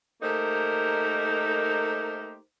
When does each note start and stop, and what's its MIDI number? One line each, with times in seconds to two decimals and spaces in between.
0.21 2.37 57
0.21 2.37 58
0.21 2.37 63
0.21 2.37 67
0.21 2.37 70
0.21 2.37 72